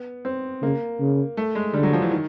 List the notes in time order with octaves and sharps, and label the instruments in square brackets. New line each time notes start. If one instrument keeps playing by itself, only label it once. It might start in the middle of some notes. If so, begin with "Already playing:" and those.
Already playing: [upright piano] B3
C4
[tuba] C#3 [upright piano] A#3
[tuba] C#3
[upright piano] A3
G#3
[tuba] D3 [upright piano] G3
[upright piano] F#3
F3
E3
D#3